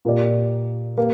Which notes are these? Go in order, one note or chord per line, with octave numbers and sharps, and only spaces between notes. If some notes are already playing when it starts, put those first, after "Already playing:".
A#2 A#3 G4 D5
A#3 G4